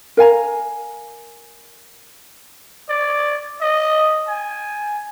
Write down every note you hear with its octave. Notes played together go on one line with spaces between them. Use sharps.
A#4 F5 G#5 A#5
D5
D#5
G#5